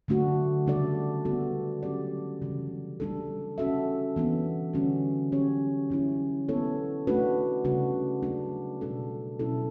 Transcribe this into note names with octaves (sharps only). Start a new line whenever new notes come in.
D3 F#3 A3 D4 F#4
C#3 G3 D4 A4 D5
D3 G3 B3 F#4 A4
F#3 A3 C#4 G4 D5
C#3 E3 G3
G3 D4 A4
C#4 F#4 A4 E5
E3 B3 D4
D3 G3 C#4 F#4
F#3 C#4 G4 C#5
D3 F#3 C#4 E4
B3 E4 A4 C#5
A3 D4 F#4 B4
C#3 G3 D4 F#4
F#3 A3 D4
B2 G3 D4 A4
B2 F#3 C#4 E4 A4